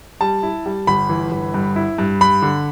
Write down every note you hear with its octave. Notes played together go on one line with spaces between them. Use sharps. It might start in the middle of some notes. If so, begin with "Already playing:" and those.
G3 A5
E4
G3
G1 B5
E3
G1
G2
E4
G2
G2 B5
D3